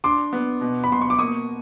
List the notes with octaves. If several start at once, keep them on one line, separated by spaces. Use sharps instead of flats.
D4 C6 D6
B3
B2
B5
B2 C6
C#6
D6
A#3 C#6 D#6